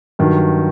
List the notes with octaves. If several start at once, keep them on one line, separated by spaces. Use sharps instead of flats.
G2 D#3 F#3